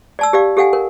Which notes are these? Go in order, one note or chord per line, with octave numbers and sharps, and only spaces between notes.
D5 A5 E6
G4 D5 F5
G4 A4 F5 F#5 G#5
A#4